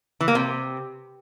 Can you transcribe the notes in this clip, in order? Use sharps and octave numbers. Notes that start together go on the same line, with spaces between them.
E3
A#3
C3